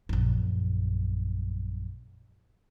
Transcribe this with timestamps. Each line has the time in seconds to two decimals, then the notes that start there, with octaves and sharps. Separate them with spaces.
0.09 A#1 F#2